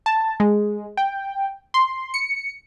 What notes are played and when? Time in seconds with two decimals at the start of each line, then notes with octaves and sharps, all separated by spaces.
0.06 A5
0.40 G#3
0.97 G5
1.74 C6
2.14 C#7